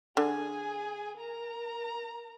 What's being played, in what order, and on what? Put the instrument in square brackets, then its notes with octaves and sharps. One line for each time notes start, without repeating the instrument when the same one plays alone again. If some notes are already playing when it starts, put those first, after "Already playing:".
[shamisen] D3 [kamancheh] G#4 G#5
[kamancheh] A#4 A#5